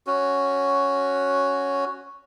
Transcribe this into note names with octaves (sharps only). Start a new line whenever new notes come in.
C#4 F#4